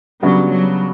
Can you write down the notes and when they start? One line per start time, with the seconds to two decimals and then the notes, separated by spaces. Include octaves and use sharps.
0.23 C#3 F#3 G3 B3 D4 F#4
0.52 F#3